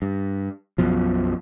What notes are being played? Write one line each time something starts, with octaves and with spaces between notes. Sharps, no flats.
G2
B1 F#2 B2 F3